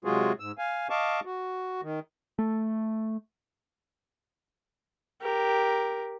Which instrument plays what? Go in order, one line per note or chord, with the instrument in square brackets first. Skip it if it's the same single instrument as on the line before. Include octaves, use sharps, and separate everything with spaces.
[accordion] C3 F#3 G#3 F4 F#4 G#4
G#2 E6
F5 G#5
D#5 F5 A5 C#6 D6
F#4
D#3
[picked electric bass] A3
[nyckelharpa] G4 A#4